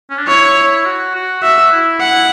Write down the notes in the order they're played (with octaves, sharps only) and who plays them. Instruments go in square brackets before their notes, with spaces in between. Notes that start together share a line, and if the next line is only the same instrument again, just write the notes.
[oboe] C#4
D4
[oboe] E4 [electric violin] C#5
[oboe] F#4
F#4
[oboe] F#4 [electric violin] E5
[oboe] E4
[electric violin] F#5